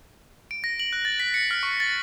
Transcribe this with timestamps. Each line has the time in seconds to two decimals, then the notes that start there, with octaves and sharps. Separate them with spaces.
0.51 D7
0.64 A#6
0.80 F#7
0.93 F#6
1.05 A6
1.20 B6
1.34 C#7
1.51 F6
1.63 C#6
1.80 A6